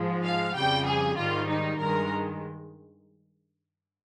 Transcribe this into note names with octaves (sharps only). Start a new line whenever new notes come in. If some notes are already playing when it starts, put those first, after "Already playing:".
Already playing: G#2 F3 G#3
F5
F2 C#3 G3 G5
G#4
G#2 D#3 G3 F4
D#4
G2 D#3 G#3 A#4